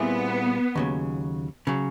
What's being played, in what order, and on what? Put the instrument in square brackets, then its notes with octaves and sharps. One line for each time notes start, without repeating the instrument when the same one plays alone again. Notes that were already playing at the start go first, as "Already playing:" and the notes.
Already playing: [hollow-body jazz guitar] A#2 G3 C4 E4 G#4 [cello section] B3
[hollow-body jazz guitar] D#2 C#3 F#3
C#3 F#3